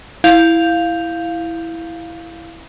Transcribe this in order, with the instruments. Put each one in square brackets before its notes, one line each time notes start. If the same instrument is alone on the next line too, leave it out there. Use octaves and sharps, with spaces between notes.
[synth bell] E4 F5 G6 F7